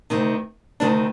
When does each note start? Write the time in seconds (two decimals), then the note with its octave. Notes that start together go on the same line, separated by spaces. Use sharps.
0.10 D2 C3 D#3
0.80 D2 C3 D#3 D4